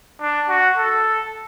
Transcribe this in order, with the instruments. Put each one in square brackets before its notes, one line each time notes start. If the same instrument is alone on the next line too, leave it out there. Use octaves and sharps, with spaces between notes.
[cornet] D4
F#4
A4